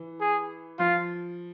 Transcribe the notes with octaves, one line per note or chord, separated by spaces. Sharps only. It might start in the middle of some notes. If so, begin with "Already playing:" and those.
Already playing: E3
G#4
F3 F4